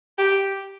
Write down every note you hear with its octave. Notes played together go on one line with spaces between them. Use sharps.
G4